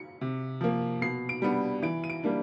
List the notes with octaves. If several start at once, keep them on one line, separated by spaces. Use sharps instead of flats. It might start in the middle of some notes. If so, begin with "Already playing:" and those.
Already playing: C#7
C3
F3 A#3
B2 C7
D7
G3 B3 D4
E3 D7
D#7
D7
G3 A#3 D4